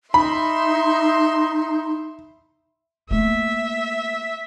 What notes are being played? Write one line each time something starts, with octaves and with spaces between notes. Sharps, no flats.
D#4 E5 B5 C6
A3 A#3 E5